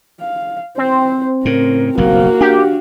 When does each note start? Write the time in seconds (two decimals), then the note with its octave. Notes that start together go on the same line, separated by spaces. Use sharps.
0.20 F5
0.78 C4 C5
1.45 A2 C#3 A#4
1.97 F#1 B1 G2 A#3 F#4 F5
2.41 D4 G4